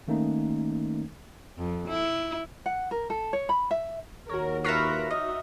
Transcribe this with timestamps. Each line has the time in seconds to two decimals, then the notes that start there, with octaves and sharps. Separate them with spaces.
0.08 D#3 A3 A#3 C#4 D#4
1.57 F2
1.88 E4
2.66 F#5
2.91 A#4
3.10 A4
3.33 C#5
3.49 B5
3.71 E5
4.29 D#2 F#4 A#4 C#5
4.64 F4 A#4 B4 E5 C#6 F6 A#6
5.11 D#4 F#4 D#5 E5